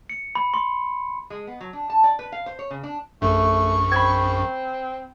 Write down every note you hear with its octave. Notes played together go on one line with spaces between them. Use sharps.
C#7
B5
C6
G#3
B3
F#3
D4
A5
D5
B4
F5
C5
C#5
C#3
D4
A#1 F#2 A3 C#6
C4 B5 G#6